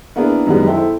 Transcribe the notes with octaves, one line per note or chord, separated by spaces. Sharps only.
A#3 B3 D4 E4 G#4
F#2 D#3 G3 G#3 B3
E4 A4 C5 G5